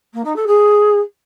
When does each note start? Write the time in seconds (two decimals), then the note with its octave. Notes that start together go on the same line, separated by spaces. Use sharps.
0.13 A#3
0.24 D#4
0.35 A4
0.46 G#4